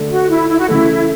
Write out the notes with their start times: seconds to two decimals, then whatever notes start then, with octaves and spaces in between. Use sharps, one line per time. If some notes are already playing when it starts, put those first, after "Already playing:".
Already playing: D3 A3 D4 A4
0.10 F#4
0.30 E4
0.49 E4
0.59 F#4
0.68 C#3 E3 A3 E4